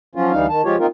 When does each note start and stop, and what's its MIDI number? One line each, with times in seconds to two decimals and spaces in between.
0.15 0.32 53
0.15 0.32 54
0.15 0.32 61
0.15 0.32 65
0.32 0.46 38
0.32 0.46 52
0.32 0.46 55
0.32 0.46 63
0.32 0.46 77
0.49 0.62 51
0.49 0.62 81
0.65 0.76 53
0.65 0.76 56
0.65 0.76 65
0.65 0.76 67
0.65 0.76 73
0.79 0.87 58
0.79 0.87 60
0.79 0.87 63
0.79 0.87 65
0.79 0.87 70